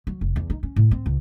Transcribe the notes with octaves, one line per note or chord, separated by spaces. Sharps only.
F#3
F1
E2
D#4
C#4
A2
C4
C#2